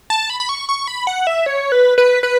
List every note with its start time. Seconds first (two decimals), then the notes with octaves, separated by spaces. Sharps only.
0.10 A5
0.30 B5
0.40 B5
0.49 C#6
0.69 C#6
0.88 B5
1.07 F#5
1.27 E5
1.46 C#5
1.72 B4
1.98 B4
2.23 B4